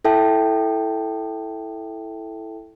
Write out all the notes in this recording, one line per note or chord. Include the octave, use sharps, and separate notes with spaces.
E4 A4 E5 G5 A5